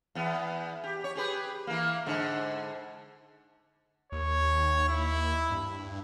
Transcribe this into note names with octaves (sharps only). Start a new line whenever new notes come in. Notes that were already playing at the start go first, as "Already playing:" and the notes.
E2 B3
G4
C#5
G4 G#4 B4
E3 A#3
G#2 D3
D#2 C#5
E4
G2